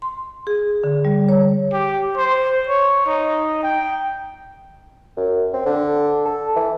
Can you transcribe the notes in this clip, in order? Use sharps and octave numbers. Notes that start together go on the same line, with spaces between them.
C6
G#4
D3
G3
C#5
G4
C5
C#5
D#4
G5
F#2
C4
D3
A4
E3